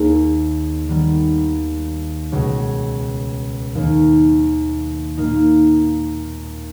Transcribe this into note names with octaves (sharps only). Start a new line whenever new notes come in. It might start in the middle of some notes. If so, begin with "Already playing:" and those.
Already playing: D#2 D#3 A#3 G#4
D#3 G3 B3
C#2 B2 G#3
D#2 D#3 A#3
A#2 A#3 D#4